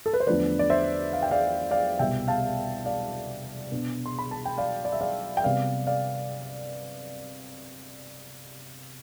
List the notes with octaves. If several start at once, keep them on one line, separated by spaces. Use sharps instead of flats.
A4
B4
C5
E2 D3 F3 A3 D4 B4 D5
D5
C5 E5
F5
G5
D5 F5
D5 F5
C2 B2 G3 E5 G5
F5 A5
D5 F5
B2 B3 D4
C6
B5
A5
G5
D5 F5
D5
E5
D5 F5
G5
C3 G3 B3 D5 F5
D5 F5